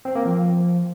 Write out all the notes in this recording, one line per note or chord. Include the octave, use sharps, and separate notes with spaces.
C4
A#3
F3